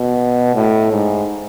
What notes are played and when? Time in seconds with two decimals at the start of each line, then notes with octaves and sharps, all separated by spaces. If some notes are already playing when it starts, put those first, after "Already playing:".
Already playing: B2
0.55 A2
0.92 G#2